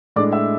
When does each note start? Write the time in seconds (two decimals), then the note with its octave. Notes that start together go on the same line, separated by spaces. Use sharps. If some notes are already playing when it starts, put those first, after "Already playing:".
0.16 A2 G#3 D4 D5 D6
0.32 E5 E6